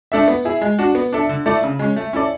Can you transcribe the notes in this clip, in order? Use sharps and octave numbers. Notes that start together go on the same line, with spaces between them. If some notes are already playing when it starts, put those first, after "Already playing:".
A3 D4 A4 E5
B3
E4 G#4
G#3
D4 F#4
B3
D4 A4 E5
D3
A3 E4 A4 D5
C#3
G#3 C#4
A3
C#4 E4 A4 D5